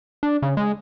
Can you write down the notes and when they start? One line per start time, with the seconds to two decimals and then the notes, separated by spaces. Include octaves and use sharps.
0.23 D4
0.42 C#3
0.57 G#3